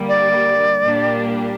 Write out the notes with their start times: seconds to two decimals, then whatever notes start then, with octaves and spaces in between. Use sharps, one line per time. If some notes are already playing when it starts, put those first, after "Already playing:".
Already playing: D3 G3 A#3
0.08 D5
0.83 A#2 G3 A#3 D4 G4